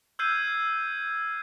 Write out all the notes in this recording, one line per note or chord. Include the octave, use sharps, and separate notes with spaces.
E6 F6 G6 G#6 C7 D#7